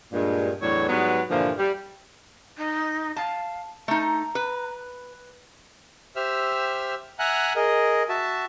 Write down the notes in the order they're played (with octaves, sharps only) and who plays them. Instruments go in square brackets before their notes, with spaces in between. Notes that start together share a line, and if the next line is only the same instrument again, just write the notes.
[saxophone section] G2 A#2 G#3
E2 A2 F#3 D4 F#4 C#5
G#2 F#3 G3 B3
G2 A#2 D3 E3 F3
G3
[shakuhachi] D#4
[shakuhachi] F5 [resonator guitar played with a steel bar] A5
[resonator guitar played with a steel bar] A3 D#4 [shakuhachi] A#5
[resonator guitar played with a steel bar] B4
[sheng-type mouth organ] G4 C5 E5 E6 F6
E5 F#5 G#5 A#5 F6 F#6
G#4 A#4 D#5
F#4 E5 A5